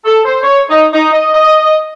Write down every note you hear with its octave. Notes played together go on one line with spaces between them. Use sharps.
A4
C5
C#5
D#4
D#4
D#5
D#5